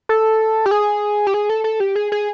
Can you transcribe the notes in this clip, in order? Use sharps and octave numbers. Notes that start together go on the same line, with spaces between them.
A4
G4
G#4
G4
G#4
A4
A4
G4
G#4
G#4